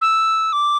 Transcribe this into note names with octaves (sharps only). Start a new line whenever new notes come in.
E6
D6